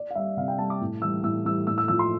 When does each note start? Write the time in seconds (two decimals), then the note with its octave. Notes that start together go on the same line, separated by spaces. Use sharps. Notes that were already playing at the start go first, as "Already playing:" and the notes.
Already playing: D5
0.11 F5
0.15 G3 E5
0.37 C3 F5
0.48 G5
0.59 G3 A5
0.70 D6
0.81 A2
1.02 E3 G3 E6
1.24 A2 E6
1.45 E3 G3 E6
1.67 A2 E6
1.78 E6
1.88 F3 E6
1.99 C6